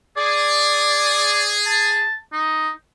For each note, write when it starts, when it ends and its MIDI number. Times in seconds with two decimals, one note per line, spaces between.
0.17 2.04 68
0.17 1.54 74
1.67 2.17 81
2.33 2.70 63